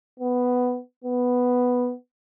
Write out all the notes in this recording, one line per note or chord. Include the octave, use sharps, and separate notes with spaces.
B3
B3